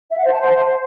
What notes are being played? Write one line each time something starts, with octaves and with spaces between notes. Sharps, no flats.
E5
F#5
C5
A5
C5